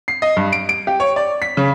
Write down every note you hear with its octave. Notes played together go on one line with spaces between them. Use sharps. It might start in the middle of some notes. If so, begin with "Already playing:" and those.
C7
D#5
G2
D7
D7
G4
C#5
D5
B6
C#3